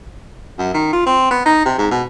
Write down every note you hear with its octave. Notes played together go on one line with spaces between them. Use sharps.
F#2
D#3
F4
C4
B3
D#4
C3
G#2
B2